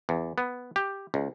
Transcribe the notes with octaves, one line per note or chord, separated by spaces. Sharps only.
E2
B3
G4
C#2